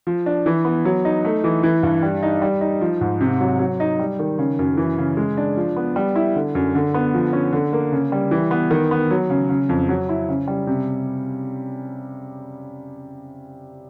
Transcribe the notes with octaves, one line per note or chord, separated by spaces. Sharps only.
F3
D4
E3
B3
F#3
D#4
A3
E3
E3
G2
G3
D#4
G3
D#4
F3
G#2
C3
F#3
F#3
D#4
G3
D#3
C#3
F#2
E3
C#3
G#3
D4
F3
B3
G3
E4
D3
F#2
D3
B3
F3
C#4
D3
A#3
C#3
G3
E3
B3
D#3
B3
F#3
C#3
C#3
F2
F#3
E4
C#3
G3
C3